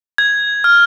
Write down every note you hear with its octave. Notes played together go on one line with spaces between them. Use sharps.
G#6
F6